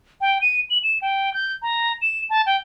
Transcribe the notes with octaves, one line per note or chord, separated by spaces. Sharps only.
G5
D#7
F#7
E7
G5
G6
A#5
E7
A5
G5